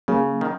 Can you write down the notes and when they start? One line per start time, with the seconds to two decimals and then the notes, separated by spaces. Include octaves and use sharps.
0.08 C#3 F#3 A#3 C#4 G#4
0.41 D#3